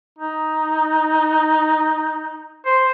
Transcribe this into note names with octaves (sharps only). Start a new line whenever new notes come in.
D#4
C5